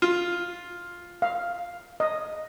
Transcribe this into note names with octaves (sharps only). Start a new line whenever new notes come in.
F4
F5
D#5